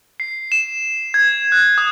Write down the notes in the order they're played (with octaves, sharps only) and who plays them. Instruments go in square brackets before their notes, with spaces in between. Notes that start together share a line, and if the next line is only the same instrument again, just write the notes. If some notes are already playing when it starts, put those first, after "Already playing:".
[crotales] C7
E7
G#6
F#6
D#6